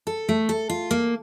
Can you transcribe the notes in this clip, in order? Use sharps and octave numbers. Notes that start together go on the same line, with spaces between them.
A4
A3
A4
F4
A#3